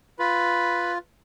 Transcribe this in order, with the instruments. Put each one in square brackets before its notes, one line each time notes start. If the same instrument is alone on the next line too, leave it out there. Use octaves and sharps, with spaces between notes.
[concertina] F4 [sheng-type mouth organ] B4 B5